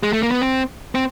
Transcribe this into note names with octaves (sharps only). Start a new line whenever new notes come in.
G#3
A3
A#3
B3
C4
C4